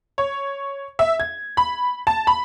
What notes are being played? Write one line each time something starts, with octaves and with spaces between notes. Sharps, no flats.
C#5
E5
G#6
B5
A5
B5